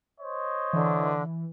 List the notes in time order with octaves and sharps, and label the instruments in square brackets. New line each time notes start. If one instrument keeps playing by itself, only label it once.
[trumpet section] C5 C#5 D#5
[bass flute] D3 [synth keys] E3